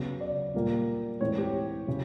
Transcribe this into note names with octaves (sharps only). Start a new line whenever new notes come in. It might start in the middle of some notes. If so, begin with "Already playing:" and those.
Already playing: C#3 F#3 B3
D5
A#2 G3 A#3
A2 E3 G#3 C4 C#5
G4
C#3 F#3